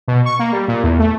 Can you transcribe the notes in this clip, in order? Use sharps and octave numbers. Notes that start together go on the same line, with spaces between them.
B2
C#6
A#3
G3
A#2
E2
A3